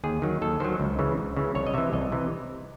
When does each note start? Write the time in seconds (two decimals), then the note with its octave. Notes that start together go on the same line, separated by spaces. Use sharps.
0.04 D#2 G#4
0.22 D#3 F#3
0.41 D#2 A4
0.60 D#3 F#3 C5
0.80 C#2
0.99 C#3 E3
1.18 C#2
1.37 C#3 E3
1.55 C2 C#5
1.67 D#5
1.74 C3 E3 E5
1.93 C2 D#5
2.12 C3 E3